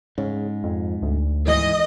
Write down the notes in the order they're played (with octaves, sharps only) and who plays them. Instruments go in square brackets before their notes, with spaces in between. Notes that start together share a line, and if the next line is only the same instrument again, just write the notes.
[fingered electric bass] G#2 [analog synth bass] C#3
[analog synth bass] F2
D2
[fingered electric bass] G#2 E3 [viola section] D#5